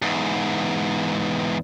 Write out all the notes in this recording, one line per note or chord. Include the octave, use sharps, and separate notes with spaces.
E2 G#2